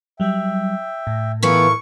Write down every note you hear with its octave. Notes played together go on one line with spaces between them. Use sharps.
F#3 G3 E5 G5
A2
E3 B3 E4 F4 A4 A#4 C#6